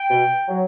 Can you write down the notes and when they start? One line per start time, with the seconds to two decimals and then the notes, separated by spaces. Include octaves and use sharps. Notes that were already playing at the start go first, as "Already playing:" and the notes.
Already playing: G5
0.09 B2
0.48 F#3